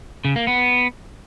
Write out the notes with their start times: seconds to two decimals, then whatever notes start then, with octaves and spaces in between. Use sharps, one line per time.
0.25 C#3
0.36 A#3
0.47 B3